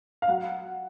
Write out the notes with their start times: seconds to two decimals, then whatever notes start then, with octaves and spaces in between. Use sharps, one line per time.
0.22 F5
0.28 F#3 F#5